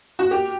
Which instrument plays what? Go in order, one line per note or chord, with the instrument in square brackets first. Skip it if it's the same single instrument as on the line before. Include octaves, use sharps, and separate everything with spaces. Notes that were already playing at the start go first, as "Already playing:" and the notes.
[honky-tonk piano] F#4
G4